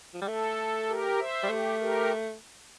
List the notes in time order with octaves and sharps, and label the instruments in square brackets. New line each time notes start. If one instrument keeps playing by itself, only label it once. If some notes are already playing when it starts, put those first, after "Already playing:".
[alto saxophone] F3
G3
[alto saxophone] A3 [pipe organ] A4
[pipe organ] G4 A#4
C5 E5
[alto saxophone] G3
[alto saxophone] A3 [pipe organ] G4
[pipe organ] G4 A#4